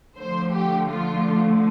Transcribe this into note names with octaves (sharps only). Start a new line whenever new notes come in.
D3 F3 A3 C5
G4
F4